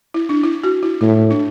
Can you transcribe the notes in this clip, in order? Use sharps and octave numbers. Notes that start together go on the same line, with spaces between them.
E4
D4
E4
F#4
E4
A2 E4
D4